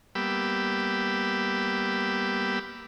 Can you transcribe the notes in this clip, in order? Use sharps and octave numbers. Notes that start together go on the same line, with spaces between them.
G3 A#3 B3 G4 B5 E6